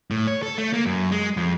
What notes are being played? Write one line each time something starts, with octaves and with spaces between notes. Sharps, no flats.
A2
C#5
A4
A3
A#3
F#2
G#3
F2